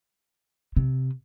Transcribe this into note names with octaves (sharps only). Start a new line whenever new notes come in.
C3